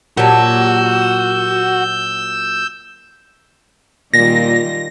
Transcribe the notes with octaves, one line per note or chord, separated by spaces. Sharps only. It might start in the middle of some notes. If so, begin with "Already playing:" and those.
A#2 F#3 F#4 G4 A5 E6 G6
A#2 D#3 G3 F4 A#6